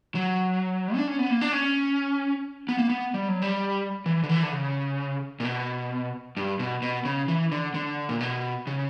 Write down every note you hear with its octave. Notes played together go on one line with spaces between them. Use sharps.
F#3
D4
C#4
B3
A#3
D4
C#4
B3
A#3
B3
G3
F#3
G3
E3
D3
E3
D3
C#3
A#2
B2
G2
B2
B2
C#3
E3
D3
D3
A#2
B2
C#3